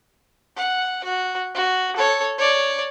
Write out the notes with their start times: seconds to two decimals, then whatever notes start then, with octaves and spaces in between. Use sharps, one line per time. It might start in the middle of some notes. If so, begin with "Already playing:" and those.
0.57 F#5
1.04 F#4
1.55 F#4
1.96 A4 C#5
2.38 C#5 D5